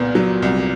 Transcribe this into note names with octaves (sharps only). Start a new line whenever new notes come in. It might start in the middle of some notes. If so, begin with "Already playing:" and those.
Already playing: C2 A#2 B3
F#3
C2